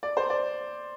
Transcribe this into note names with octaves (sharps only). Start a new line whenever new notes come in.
D5
C5
D5